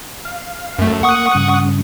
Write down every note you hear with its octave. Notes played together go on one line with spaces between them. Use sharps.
F5
F#2 A3
A#3 F#5 C#6 D#6
G2 C#3